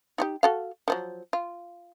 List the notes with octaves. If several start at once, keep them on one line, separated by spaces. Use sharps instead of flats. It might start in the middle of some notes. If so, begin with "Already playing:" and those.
D#4 F4 G4
F#4 A4 F5
D#3 F3 F#3
F4